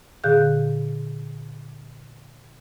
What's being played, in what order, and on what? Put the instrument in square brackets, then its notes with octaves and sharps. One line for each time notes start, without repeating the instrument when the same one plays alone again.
[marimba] A#2 D3 G#4 F5 F#6 G6